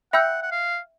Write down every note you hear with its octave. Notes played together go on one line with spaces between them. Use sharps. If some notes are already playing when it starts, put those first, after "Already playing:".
E5 F#5 G5 B5 E6 G6
F#5
F5